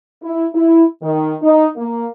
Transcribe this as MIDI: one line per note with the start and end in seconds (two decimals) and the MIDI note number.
0.22 0.45 64
0.55 0.84 64
1.02 1.35 51
1.42 1.66 63
1.76 2.06 58